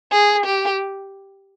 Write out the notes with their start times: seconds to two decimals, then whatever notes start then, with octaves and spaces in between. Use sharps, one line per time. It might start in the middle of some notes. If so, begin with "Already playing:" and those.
0.12 G#4
0.46 G4